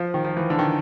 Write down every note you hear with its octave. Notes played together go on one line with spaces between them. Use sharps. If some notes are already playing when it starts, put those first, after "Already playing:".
Already playing: F3
D#3
F3
E3
D3
D#3